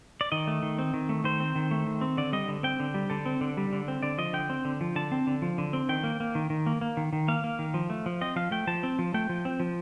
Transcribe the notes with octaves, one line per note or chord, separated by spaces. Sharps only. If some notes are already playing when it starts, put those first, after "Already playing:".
D5
D#3 D#5
A3
D#3
C4
D#3
A3
D#3 C5
C4
D#3
A3
D#3
C4
D3 D5
G3 D#5
D3
C4 G5
D3
G3
D3 A4
C4
D3
G3
D3
C4
D3 D5
F3 D#5
D3 G5
C4
D3
F3
D3 A5
C4
D3
F3
D3
C4
D#3 G5
A#3
A#3
D#3
D#3
A#3
A#3
D#3
D#3
A#3 F5
A#3
D#3
F3
A3
F3
C4 D#5
F3 F5
A3 G5
F3 A5
C4
F3
A3 G5
F3
C4
F3